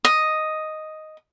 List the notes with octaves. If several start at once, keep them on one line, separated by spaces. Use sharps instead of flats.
D#5